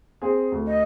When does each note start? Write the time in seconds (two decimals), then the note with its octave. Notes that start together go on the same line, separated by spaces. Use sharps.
0.22 C4 G#4
0.52 D2
0.67 D#5